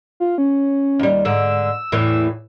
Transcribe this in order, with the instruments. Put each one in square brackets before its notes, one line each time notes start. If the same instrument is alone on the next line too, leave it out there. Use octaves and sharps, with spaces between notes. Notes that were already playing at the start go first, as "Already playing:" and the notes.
[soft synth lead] F4
C#4
[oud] D#2 G3
[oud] G#2 D3 [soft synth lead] E6
[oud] E2 A2 E3